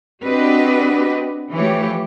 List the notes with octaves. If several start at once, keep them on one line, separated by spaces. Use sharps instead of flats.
C4 D4 F#4 G4 B4 D#5
E3 F3 A3 G4 C#5